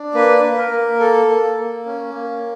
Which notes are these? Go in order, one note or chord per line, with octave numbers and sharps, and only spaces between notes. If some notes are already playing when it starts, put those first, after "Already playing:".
Already playing: D4
A#3 B4
A#3
A#4
A#3
A4
A#3
A#3
C#4
A#3